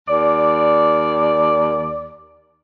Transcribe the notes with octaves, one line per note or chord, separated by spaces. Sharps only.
D#2 D5